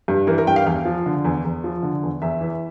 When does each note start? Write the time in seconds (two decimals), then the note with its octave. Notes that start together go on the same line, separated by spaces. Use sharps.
0.08 G2
0.27 E3 A#4
0.38 A#4
0.47 G2 G5
0.56 F5
0.66 E2 F5
0.85 F3
1.06 D3
1.25 E2
1.44 E2
1.64 F3
1.83 D3
2.03 E2
2.22 E2 E5
2.41 E3